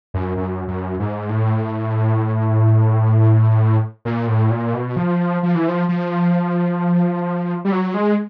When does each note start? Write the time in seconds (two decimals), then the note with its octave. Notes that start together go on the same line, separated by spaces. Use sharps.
0.14 F#2
0.37 F#2
0.68 F#2
0.99 G#2
1.29 A2
4.05 A#2
4.28 A2
4.51 A#2
4.74 B2
4.96 F3
5.43 F3
5.55 E3
5.68 F3
5.89 F3
7.65 G3
7.72 F#3
7.94 G#3